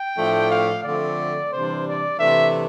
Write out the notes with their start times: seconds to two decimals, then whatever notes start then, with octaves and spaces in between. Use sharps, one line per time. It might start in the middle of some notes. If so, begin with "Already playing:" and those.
Already playing: G5
0.16 A2 F3 A3 D4
0.50 F5
0.83 D3 F3 A3 C4 D5
1.51 C3 E3 G3 D4 C5
1.85 D5
2.18 C3 E3 A3 D4 E5